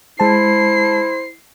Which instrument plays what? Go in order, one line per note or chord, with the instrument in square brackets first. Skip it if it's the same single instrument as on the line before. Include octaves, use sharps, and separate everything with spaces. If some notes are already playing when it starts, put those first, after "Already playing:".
[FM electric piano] G#3 A5 [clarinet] E4 [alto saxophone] C5 [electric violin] C7